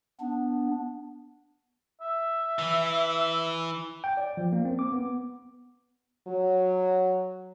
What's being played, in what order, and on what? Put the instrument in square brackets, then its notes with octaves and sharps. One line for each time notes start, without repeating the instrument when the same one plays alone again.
[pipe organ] B3 D4
[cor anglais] E5
[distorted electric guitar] E3
[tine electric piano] G5
D5
F3
A#3
C4
D6
B3
[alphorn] F#3